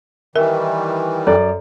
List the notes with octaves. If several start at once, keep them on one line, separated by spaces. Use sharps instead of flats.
D#3 E3 G3 A#4 E5
F#2 A4 D5